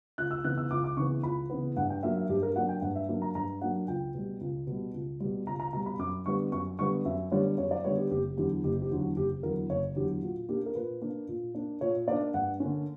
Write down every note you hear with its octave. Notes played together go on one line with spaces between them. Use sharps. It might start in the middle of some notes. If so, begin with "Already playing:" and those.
C#2 F#6
E6
C#3 E3 B3 F#6
E6
C#2 D6
D6
C#3 E3 B3 C#6
C#2 B5
C#3 E3 B3
G2 F#5
G5
F#3 A#3 D4 E5
E5
G2 G4
A#4
F#3 A#3 D4 F#5
G5
G2 F#5
E5
F#3 A#3 D4
A#5
G2 A#5
F#3 A#3 D4 F#5
C#2 G5
B2 G3
C#2
B2 G3
C#2
B2 G3
C#2 A#5
A#5
B2 G3 A#5
B5
F#2 D6
D3 G3 B3 C#6
F#2 C#6
D3 G3 B3 C#6
F#2 E5
D3 G3 B3 C#5
F#2 C#5
D5
D3 G3 B3 C#5
G4
F#1 G4
E2 D3 F#3 G4
F#1 G4
G4
E2 D3 F#3
F#4
F#1 G4
E2 D3 F#3 A#4
F#1 C#5
E2 D3 F#3 G4
A#2 F#4
A#3 D4 G4
A#4
A#2 B4
A#3 D4
A#2
A#3 D4
A#2 C#5
A#3 D4 D5
G2 F#5
D3 A#3 C#4